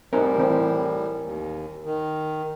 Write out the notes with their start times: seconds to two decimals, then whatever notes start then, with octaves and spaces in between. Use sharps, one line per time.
0.13 A2 G3 C4 D#4 A#4 G#5
0.38 E3 C4 G4
1.22 D#2
1.85 D#3